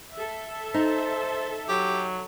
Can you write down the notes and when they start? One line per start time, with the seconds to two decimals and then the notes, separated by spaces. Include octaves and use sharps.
0.13 A4 E5
0.74 D#4 C5
1.69 F#3 G4